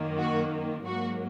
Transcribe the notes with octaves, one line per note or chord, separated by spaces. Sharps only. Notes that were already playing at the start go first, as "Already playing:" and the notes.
Already playing: F#2 D#3 A#3
F#4
G#2 F#3 A#3 F#4